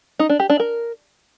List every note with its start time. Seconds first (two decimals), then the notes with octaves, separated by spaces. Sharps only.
0.19 D#4
0.29 D4
0.40 G4
0.50 D4
0.60 A#4